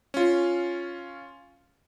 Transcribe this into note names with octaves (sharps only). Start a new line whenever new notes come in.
C#4 F4